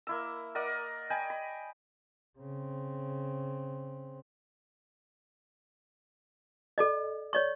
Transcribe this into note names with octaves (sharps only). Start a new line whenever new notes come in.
A#3 E4 E6
A#4 D5 D#5 F#5
D#5 G5 G#5 B5
B5
C#3 C4
A4 D5 D#5
C#5 D5 C#6